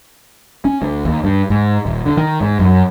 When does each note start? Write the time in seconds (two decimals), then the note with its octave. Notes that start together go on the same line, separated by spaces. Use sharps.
0.65 C#4
0.82 D2
1.05 D#2
1.24 G2
1.50 G#2
1.86 D#1
2.05 D3
2.17 D#3
2.41 G#2
2.59 F#2